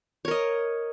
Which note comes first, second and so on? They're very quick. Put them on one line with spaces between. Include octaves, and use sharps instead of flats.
C#5 A#4 D#5